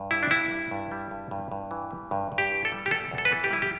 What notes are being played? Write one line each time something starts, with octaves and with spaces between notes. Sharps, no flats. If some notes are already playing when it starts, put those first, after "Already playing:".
Already playing: G2
G3 E4
D4
G2 E4
G3
G2
G3
G2
G2
G2
E3
G3
G2
G2
G4
E3
A4
G3
G4
E2 A4
E2
A4
B4
E3 A4
G4
G3 E4
G4